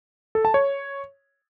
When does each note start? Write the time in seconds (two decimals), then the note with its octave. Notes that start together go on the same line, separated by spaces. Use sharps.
0.35 A4
0.45 A5
0.54 C#5